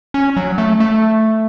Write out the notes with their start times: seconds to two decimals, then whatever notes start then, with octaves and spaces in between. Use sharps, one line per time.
0.14 C#4
0.37 F#3
0.58 A3
0.80 A3